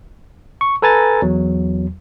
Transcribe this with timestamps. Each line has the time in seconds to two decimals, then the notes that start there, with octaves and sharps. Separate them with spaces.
0.61 C#6
0.82 A4 B4 G#5 A#5 A6
1.22 E2 F#3